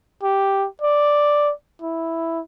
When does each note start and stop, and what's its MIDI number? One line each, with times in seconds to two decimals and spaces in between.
0.23 0.68 67
0.81 1.52 74
1.82 2.40 64